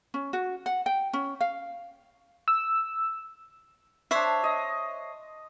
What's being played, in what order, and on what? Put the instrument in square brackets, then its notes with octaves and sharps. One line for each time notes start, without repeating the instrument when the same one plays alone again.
[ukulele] C#4
F#4
F#5
G5
C#4
F5
[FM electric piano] E6
[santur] D4 C6 [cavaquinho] C5 C#5 E5
[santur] D#5